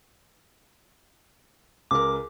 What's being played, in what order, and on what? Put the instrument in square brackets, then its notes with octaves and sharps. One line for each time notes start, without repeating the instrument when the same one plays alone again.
[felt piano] C#2 A#4 [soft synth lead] D6